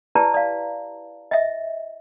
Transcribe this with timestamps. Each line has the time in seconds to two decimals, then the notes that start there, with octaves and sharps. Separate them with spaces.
0.15 E4 G4 B4 D5 A5 A#5
0.34 D5 F5
1.31 D#5 E5